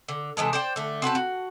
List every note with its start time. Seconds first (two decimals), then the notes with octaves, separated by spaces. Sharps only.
0.08 D3
0.37 C3 E3 G#3 A4
0.53 C5 D5 G5
0.76 D3 A3
1.02 C4 F#4 B4 A5
1.15 F#4